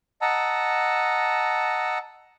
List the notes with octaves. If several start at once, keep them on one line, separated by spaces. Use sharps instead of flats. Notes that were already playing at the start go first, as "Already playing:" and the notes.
D#5 F#5 A5 A#5 E6